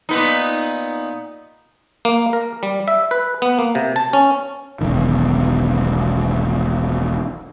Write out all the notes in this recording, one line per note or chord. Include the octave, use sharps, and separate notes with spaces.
A#2 B3 D#4
A#3
A#4
G3
E5
B4
B3
A#3
C3
A5
C#4
E1 B1 D#3